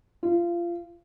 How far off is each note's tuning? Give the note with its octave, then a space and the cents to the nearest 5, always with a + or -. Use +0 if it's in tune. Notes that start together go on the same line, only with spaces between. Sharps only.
F4 -25